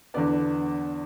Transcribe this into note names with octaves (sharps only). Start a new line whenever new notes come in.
E2 D3 B3 D5